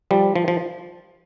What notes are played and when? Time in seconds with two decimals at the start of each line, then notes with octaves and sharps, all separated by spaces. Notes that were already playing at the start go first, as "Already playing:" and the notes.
0.11 F3 G3
0.36 F3
0.48 F3